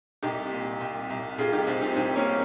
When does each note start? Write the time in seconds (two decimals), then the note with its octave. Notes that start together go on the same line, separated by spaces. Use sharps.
0.23 C2 D#4 G4
0.51 A#2
0.81 C2
1.10 C2
1.38 C2 F4 G#4
1.52 D#4 G4
1.67 C2 C4 D#4
1.81 C4 D#4
1.95 C2 C4 D#4
2.15 A#3 C#4